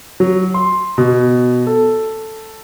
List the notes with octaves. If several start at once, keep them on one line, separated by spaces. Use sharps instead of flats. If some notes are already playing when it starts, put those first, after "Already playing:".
F#3
C6
B2
A4